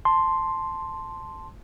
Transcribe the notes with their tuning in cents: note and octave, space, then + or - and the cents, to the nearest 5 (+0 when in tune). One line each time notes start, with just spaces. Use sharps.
A5 +0 C6 +0